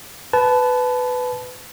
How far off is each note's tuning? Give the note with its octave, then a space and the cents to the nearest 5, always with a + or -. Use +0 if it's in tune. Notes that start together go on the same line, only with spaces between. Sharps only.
B4 +15 A5 -20